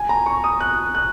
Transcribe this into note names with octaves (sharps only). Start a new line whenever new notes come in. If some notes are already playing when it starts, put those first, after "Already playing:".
Already playing: G#5
A#5
C#6
D#6
F#6
F#6